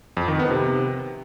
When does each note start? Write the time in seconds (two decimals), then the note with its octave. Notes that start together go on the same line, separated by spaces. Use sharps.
0.17 F2
0.28 D#3
0.39 B3
0.51 C3